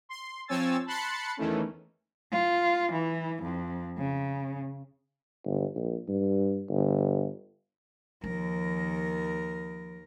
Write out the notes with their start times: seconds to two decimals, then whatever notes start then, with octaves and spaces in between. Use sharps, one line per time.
0.09 C6
0.48 F3 C4 C#5 G#5 E6 A6
0.86 A5 B5 C6 F#6 A6 C#7
1.37 E2 D#3 E3 A3 C#4
2.32 F4
2.92 E3
3.43 F2
3.98 C#3
5.46 G1
5.76 A#1
6.09 G2
6.69 G1
8.24 D#2 F3 A#4